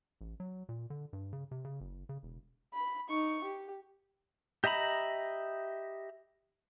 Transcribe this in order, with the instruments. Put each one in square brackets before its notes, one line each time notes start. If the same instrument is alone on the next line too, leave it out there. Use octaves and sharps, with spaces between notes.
[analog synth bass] A1
F#3
A#2
D3
G2
C#3
C3
C#3
F#1
C#3
E1
[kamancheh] B5
D#4 C#6
G4
[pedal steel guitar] G4 D#5 E5 A#5 B5